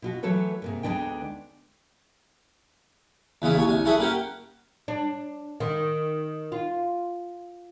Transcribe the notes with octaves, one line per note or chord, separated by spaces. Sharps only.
B2 F4 F#4
E3 F#3 A3 A4 B4 C#5
G#2 C3 A#3
D2 G#3 B3 D4 D#4 G5
E2 C#3 B3 E4
D#2 C#5 G#5
C2 G#5
C#4 E4 G#4 A4 E5 F#5
A#3 C#4 G4 F#5 G5
D4
D#3
F4